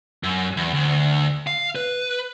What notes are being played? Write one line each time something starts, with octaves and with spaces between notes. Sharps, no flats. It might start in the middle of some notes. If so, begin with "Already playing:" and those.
F#2
E2
D2
F5
B4